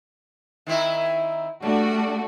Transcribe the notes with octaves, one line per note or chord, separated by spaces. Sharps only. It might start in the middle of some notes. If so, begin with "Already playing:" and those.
D#3 C4 E4
G3 A3 D4 F#4